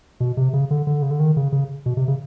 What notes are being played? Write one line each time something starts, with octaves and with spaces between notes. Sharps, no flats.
B2
C3
C#3
D3
D3
C#3
D3
D#3
C#3
C#3
B2
C3
C#3